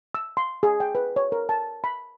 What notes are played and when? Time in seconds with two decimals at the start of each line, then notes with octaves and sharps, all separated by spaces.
0.15 E6
0.37 C6
0.63 G#4
0.80 G5
0.95 B4
1.16 C#5
1.32 A#4
1.49 A5
1.84 B5